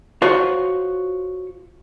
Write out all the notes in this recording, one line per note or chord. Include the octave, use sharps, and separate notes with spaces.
F4 F#4 C5 C#5